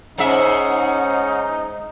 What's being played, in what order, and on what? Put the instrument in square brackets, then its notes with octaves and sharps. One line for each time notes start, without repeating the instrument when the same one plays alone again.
[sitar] G#2 E5 [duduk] C#4 [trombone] D#4 [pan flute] F#5